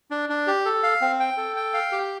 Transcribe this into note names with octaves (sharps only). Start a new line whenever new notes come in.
D4
D4
G4
A4
F5
C4
G5
A4
G5
F5
G4